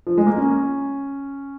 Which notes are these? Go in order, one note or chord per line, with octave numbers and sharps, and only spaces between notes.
F3
G#3
A#3
C#4